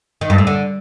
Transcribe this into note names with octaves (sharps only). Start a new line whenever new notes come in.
D#3
G2
A2
D3